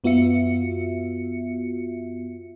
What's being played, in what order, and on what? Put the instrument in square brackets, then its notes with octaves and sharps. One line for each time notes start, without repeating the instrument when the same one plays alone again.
[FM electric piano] F#2 B3 F4 F#4 E5 C#7